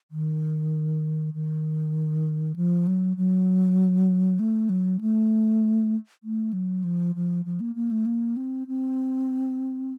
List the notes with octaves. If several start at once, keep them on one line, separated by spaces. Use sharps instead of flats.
D#3
D#3
F3
F#3
F#3
A3
F#3
A3
A3
F#3
F3
F3
F3
A#3
A#3
A3
A#3
C4
C4